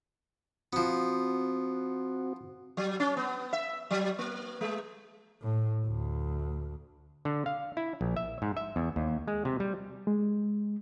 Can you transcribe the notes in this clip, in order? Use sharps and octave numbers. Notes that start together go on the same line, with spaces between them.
F3 B3 C4 F#4
F#3
C#4
B3
E5
F#3
A#3
G#3
A2
D2
D3
F5
E4
A#1
E5
G#2
E5
E2
D#2
G#3
C3
G3
G#3